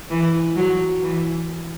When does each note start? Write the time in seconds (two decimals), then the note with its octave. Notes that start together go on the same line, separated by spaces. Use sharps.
0.10 E3
0.56 F#3
1.03 E3